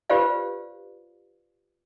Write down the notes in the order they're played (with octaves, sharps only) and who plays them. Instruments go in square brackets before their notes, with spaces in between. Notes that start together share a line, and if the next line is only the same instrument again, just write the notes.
[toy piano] F4 G4 B4 C5 D5 F5